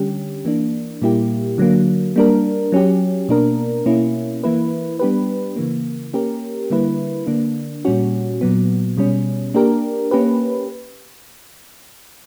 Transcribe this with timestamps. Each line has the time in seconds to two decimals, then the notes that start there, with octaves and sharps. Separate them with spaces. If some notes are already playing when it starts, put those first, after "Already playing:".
Already playing: D3 G3 C#4 G4
0.45 E3 A#3 D4
1.02 A#2 G3 A#3 E4 G4
1.58 D3 F#3 A#3
2.16 G3 A#3 D4 A#4
2.72 F#3 C#4 G4
3.29 B2 A#3 D4 A#4
3.86 B2 A#3 C#4 E4
4.44 E3 A#3 E4 B4
4.99 G3 B3 D4 G4 B4
5.56 C#3 E3 A#3
6.14 A#3 C#4 G4 A#4
6.70 D3 G3 A#3 E4 B4
7.27 D3 A#3 D4
7.85 A#2 G3 C#4 F#4
8.41 A#2 F#3 B3
8.97 B2 G3 C#4
9.54 A#3 D4 G4 A#4
10.11 A#3 C#4 G4 B4